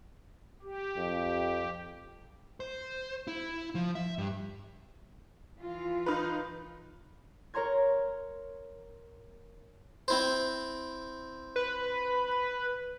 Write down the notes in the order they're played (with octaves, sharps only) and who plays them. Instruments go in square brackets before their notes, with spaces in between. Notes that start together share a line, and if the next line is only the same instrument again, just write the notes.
[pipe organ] G4
[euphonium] F2
[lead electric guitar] C5
E4
F3
E5
G2
[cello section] E3 F4
[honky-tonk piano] D#4 A#4 B4
[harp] A#4 C#5 A#5 C6 G#6
[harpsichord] C4 E4 C5
[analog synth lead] B4